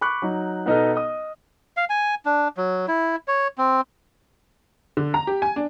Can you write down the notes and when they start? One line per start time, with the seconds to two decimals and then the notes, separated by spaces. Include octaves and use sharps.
0.01 B5 C#6 D6 F#6
0.22 F#3 D#4
0.66 B2 B3 D#4 A4 D#5 F6
0.95 D#5 D#6
1.77 F5
1.90 G#5
2.25 D4
2.57 F#3
2.88 E4
3.28 C#5
3.58 C4
4.97 D3
5.14 A#5
5.27 G4
5.42 G#5
5.56 D4